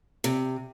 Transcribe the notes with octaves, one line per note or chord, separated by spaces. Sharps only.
C3